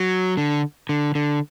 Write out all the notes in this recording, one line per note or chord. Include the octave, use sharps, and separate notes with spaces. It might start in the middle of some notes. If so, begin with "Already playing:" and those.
Already playing: F#3
D3
D3
D3